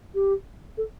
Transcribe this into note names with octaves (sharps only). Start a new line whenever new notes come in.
G4
A4